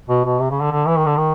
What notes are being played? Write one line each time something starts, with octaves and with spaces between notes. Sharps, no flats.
B2
B2
C3
C#3
D3
D3
E3
D#3
D3
D#3